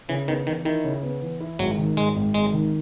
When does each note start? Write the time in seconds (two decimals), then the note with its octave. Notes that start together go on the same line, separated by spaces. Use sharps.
0.09 C#3 E3
0.28 D#3 B3
0.46 D#3 E3
0.65 D#3 E4
0.84 C#3
1.03 B3
1.22 E3
1.40 E4
1.59 G#1 F#3
1.78 D#3
1.97 G#2 G#3
2.15 G#1
2.34 G#1 G#3
2.53 D#3